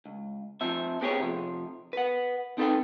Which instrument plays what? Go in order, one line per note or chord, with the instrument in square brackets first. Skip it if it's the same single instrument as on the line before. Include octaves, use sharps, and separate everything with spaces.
[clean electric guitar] C#2
F2 F3 C4 E5
B3 C4 G4 G#4 C5 C#5
C3 F3
B4 F#5
C4 D#4 A4 B4 E5 G5